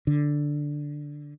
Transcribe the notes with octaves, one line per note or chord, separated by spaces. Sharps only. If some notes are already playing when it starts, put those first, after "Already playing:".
D3